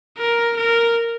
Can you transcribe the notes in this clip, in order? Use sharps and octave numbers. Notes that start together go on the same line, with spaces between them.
A#4
A#4